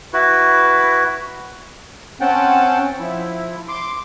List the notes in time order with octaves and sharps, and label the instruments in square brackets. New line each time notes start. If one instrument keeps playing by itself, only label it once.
[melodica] E4 F#4 B4
[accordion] C4 C#4 F#5 G5 A5
F3 E4
C6 D6